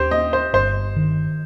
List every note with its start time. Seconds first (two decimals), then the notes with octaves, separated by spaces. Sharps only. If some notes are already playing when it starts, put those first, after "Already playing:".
Already playing: D#2 G4 C5
0.11 A#3 D#5
0.33 C5
0.53 G1 C5
0.96 D#3